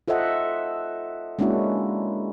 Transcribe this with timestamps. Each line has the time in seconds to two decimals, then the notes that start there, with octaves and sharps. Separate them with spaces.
0.08 F4 A4 C5 D#5 E5 F#5
1.39 G#3 A#3 C#4 D4 E4 F#4